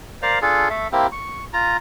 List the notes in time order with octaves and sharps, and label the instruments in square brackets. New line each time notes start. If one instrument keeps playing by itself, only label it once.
[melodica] A#4 C5 D5 F5
D4 F4 G#4 A4
A3 A4 E5
A#3 C4 E4 G4
C#6
F4 A#5